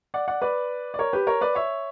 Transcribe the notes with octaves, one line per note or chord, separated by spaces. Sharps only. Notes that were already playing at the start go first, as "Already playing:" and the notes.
D5 F#5
D5 F#5
B4 D5
D5
A#4 C#5
G4 B4
A#4 C#5
B4 D5
C#5 E5